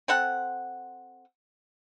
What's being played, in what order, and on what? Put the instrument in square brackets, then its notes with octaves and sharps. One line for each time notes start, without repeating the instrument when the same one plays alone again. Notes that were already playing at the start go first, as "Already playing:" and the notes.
[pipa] C4 A4 F#5